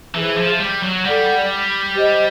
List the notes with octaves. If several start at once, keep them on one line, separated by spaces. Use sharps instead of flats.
E3 G#4 C5 E5
F3
G3
F#3
G3 A4 D5 F#5
G4 C5 D#5